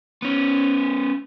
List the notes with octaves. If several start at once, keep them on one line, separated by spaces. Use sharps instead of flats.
B3 C#4